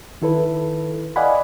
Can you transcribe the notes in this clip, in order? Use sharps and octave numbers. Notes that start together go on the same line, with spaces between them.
D#3 E4 A4 B4
D5 D#5 F5 F#5 G#5 B5